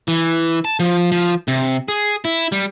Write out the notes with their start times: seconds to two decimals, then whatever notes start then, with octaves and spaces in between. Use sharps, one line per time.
0.08 E3
0.65 A5
0.80 F3
1.12 F3
1.48 C3
1.88 G#4
2.25 E4
2.52 G3